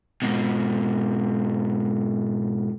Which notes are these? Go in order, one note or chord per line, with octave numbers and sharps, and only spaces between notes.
G#2 B2